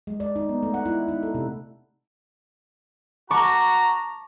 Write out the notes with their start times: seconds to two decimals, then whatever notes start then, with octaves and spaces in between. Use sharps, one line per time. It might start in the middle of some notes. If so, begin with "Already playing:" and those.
0.07 G#3
0.20 D5
0.36 D#4
0.49 B3
0.63 A3
0.74 F#5
0.86 E4
1.08 D#4
1.23 A4
1.34 C3
3.31 F#4 A5 A#5 C#6 D6